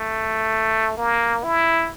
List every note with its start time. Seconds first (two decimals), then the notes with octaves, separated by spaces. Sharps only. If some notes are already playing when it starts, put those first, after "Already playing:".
Already playing: A3
0.97 A#3
1.44 E4